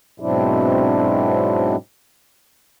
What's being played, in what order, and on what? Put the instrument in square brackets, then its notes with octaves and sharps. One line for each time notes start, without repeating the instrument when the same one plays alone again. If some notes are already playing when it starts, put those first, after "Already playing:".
[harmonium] G#2 B2 F#3 C4 D4 E4